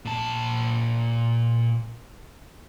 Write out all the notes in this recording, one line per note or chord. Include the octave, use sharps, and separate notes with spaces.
A#2 A5